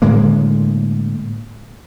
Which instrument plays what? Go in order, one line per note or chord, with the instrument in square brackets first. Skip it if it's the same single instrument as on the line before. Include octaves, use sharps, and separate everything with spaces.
[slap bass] A2 D3 G#3 A#3